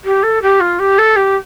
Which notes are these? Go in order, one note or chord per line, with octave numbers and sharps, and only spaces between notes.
G4
A4
G4
F4
G4
A4
G4